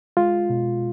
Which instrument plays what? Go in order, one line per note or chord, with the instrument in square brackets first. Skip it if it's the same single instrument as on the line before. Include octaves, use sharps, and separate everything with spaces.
[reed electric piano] G#3 F4
B2